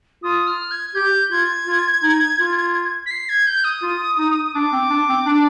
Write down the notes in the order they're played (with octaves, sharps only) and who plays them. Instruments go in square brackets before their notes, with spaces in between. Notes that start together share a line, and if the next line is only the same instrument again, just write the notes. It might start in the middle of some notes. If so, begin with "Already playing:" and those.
[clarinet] F4 [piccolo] D#6
[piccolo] F6
G#6
[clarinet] G4 [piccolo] G6
[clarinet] F4 [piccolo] G#6
[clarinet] F4
D#4
F4
[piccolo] B6
C7
G#6
G6
D#6
[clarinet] F4
D#4
[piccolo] D#6
[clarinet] D4 [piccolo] D6
[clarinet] C4
D4
C4
D4